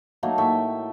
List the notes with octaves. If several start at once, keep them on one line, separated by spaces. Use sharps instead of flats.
F#3 A3 A#3 D#4
A2 E5 G5 C#6